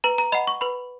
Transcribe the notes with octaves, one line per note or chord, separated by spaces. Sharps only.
B4 A#5
A#5
D#5 F#5 B5
C#6
B4 B5